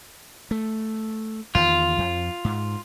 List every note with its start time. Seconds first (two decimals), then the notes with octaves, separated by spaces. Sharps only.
0.51 A3
1.55 E2 D#3 F4
1.98 F2
2.45 G#2